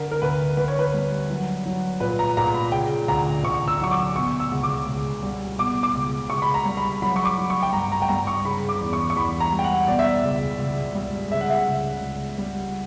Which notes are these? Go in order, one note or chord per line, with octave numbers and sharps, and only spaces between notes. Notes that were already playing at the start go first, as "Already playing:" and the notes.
Already playing: D3 A#4
A#4
D2 B4
D2 B4
C#5
B4
G3
F#3
F#3
A#2 B4
A#5
A#2 A#5
B5
C#3 G5
D2 A#5
D2 C#6
E6
F#3 C#6
D6
B2 C#6
E6
C#2
D6
C#2
G3
B2 D6
D6
C#2
C#2 C#6
B5
A#5
G3
B5
F#3 B5
C#6
D6
F#3
C#6
G5
G2 A#5
A#5
G5
G2 A#5
C#6
C#3 B5
D6
E2
C#6
C#6
E2 B5
A#5
G3
G5
F#5
B2 D5
E5
D5
C#2
C#2
G3
C#3 E5
F#5
E5
C#2
C#2
G3